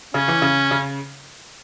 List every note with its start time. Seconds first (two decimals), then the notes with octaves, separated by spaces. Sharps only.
0.14 C#3 C#4
0.28 E3
0.42 C#3
0.71 C#3